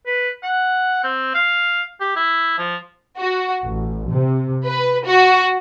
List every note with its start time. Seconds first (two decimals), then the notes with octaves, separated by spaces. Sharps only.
0.07 B4
0.43 F#5
1.03 C4
1.34 F5
2.00 G4
2.16 E4
2.58 F3
3.18 F#4
3.65 A1
4.10 C3
4.66 B4
5.05 F#4